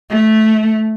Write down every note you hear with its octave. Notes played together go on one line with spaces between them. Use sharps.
A3